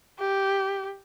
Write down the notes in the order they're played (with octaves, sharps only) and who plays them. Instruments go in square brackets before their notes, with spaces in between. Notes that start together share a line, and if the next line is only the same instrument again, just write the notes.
[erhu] G4